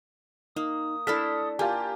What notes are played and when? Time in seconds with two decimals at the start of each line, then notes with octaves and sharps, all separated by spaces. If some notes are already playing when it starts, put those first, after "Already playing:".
0.56 A#3 D#4 D#6
1.07 A3 D4 E4 A4 F6 B6
1.59 A#3 F4 G4 G#5 A5